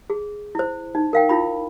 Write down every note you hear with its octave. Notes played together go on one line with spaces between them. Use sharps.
G#4
E4 C5
D#4
A#4 F5 G5
E4 F4 B5